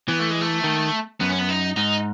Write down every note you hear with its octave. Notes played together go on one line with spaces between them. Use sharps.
E3 B3
A3
G#3
A3
D#3
F#2 B3
C#4
B3
D#4
G#2 D#4